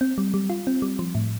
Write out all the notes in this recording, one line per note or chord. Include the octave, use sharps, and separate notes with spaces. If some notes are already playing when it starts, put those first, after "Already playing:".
C4
G3
G3
F4
C4
G3
F3
A2